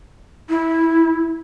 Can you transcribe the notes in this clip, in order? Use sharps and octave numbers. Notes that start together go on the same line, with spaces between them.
E4